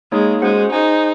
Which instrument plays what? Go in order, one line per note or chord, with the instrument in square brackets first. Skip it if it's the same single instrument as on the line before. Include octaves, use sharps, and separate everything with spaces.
[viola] G#3 [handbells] A#3 D#4 G#4 C#5
[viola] G#3 [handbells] C#4 F#4 C5 F#5
[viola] D#4 [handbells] G#4 C5 D#5 G#5